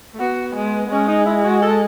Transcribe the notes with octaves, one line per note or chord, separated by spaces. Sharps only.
A3
B3 F#4
G#3
B3
G#3 C#4
D#4
E4
F#4
A4